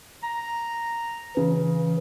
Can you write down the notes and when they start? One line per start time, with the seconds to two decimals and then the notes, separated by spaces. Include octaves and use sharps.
0.23 A#5
1.37 C#3 E3